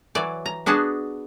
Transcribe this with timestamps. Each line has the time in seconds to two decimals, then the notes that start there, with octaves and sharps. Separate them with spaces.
0.15 E3 F#3 D5
0.46 A#5
0.66 B3 D4 F#4 G#4 A5